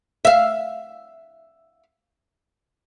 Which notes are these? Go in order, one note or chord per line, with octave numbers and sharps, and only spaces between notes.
E5 F5